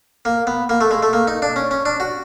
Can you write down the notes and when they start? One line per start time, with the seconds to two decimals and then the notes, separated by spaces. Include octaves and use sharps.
0.25 A#3
0.47 B3
0.69 A#3
0.81 A3
0.91 G#3
1.03 A3
1.13 A#3
1.27 D#4
1.42 D4
1.56 C#4
1.71 C#4
1.85 D4
2.00 F#4